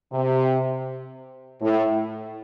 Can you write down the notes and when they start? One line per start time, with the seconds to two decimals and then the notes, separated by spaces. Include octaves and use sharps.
0.13 C3
1.61 A2